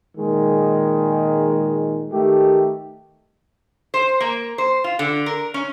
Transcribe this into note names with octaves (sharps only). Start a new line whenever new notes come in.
A#2 D#3 G#3
D#3 A3 G4
C5
A#3
C5
F4
D3
A#4
C#4